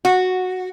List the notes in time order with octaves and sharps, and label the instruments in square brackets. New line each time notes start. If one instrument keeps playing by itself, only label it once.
[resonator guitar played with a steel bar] F#4